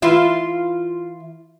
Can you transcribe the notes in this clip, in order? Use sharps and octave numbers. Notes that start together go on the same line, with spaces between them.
E3 F4 E5